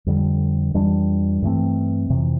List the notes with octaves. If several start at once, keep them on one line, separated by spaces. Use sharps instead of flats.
F2 D3 G3
F2 E3 G3 D4
G2 E3 A3 C4
F2 C3 E3